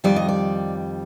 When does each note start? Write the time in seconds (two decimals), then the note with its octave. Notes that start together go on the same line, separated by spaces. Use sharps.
0.04 F2 D#3 G3 D5
0.16 D#5
0.29 D5